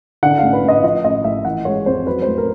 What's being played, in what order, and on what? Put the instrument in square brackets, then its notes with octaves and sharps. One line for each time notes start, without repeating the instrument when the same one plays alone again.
[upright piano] D3 F#5
A1 F5
B4
A1 D#5
F3 D#5
A1 D#5
A1 E5
E3 F#5
G#3 C#5
F2 C5
F#3 B4
A3 C5
A#4